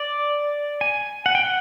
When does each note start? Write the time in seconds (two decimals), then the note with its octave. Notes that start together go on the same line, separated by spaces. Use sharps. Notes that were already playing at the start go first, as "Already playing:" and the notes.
Already playing: D5
0.81 G#5
1.26 F#5
1.35 G5
1.44 F#5